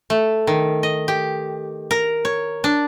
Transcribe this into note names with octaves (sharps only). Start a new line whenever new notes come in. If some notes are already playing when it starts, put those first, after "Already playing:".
A3
D#3
D#5
G4
A#4
C#5
D4